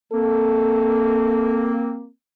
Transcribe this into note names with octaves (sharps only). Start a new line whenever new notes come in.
A#3 C4 A4